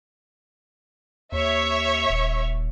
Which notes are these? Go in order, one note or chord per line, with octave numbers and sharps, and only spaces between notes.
D#2 C#5 E5
D#1